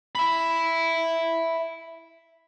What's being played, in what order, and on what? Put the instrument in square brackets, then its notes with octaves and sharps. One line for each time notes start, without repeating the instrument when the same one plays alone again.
[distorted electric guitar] E5 B5